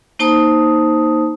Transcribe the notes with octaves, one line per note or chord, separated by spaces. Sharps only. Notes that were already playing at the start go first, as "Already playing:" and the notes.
A#3 D#4 C5 A5 D#6